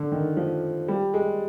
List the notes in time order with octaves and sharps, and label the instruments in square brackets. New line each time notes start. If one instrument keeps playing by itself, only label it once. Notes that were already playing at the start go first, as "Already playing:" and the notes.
Already playing: [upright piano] D3
D#3
F3
G3
G#3